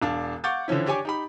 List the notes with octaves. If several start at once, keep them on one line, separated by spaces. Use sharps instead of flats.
E1 D4 F5 A5
F5 F#5 C#6 D6 G6 A6
D3 E3 F3 C#4 E4
D4 G4 C#5 G#5 D6
D#4 G4 B5